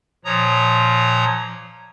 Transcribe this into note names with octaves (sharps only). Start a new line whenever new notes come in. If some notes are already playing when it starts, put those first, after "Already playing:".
A#2 F3 C#5 A#5 D#6